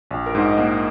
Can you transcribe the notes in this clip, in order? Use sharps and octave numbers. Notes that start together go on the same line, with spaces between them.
A#1
A#4
G#2
D#5
A#3 F#5